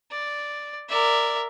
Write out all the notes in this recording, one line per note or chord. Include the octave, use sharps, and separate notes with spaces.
D5
A#4 D5 E5